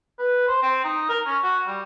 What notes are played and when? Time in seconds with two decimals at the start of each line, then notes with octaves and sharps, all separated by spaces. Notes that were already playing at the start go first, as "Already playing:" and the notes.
0.19 B4
0.48 C5
0.62 C4
0.84 D#4
1.09 A#4
1.26 C#4
1.43 F#4
1.67 G3